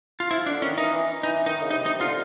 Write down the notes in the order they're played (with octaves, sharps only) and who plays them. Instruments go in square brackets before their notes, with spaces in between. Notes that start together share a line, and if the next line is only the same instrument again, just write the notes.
[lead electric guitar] F4
[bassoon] F3 [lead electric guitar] E4
[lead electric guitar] D4
[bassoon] D3
[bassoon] D#3 [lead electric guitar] C#4
[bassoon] E3 [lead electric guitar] D#4
[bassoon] E3
[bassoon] E3 [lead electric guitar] D#4
[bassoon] D#3 [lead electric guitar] D#4
[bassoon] C#3
[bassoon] C3 [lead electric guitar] D#4
[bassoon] C3 [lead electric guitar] D#4
[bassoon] D3 [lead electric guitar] F4